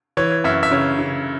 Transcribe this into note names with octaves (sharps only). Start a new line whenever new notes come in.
E3 C#5
F#2 E5
E5
C#3 C#5
C#3